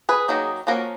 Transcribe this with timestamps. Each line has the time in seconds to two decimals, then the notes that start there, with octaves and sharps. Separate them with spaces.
0.09 G#4 B4
0.28 D#3 F#3 A#3 D#4
0.67 F3 A#3 C#4 F#4 A#4